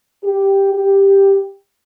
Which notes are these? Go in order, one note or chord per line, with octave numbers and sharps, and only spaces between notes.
G4
G4